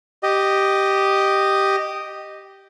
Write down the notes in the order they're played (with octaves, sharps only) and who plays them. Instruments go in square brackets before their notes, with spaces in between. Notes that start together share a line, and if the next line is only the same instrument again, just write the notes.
[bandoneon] G4 D#5